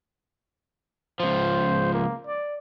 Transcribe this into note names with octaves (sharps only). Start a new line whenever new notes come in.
C#2 F3 C5
A#3
D5